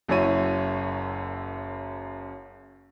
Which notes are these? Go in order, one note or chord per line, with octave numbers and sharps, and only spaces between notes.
F#1 F#2 E4 C#5 D#7